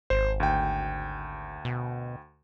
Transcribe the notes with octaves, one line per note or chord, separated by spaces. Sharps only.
G#1 C5
D2 G5
B2